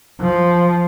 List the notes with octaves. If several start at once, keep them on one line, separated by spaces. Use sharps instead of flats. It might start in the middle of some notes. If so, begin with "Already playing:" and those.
F3